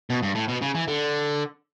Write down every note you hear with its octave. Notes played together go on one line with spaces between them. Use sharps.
B2
G2
A2
B2
C#3
E3
D3